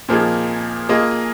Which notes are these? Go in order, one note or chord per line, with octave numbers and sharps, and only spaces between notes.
A#2 F3 A#3 D#4 G#4
A#3 F4 G#4 D#5